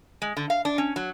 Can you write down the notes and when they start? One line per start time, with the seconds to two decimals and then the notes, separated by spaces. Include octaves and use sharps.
0.22 G#3
0.37 D3
0.50 F5
0.65 D4
0.78 C#4
0.96 F#3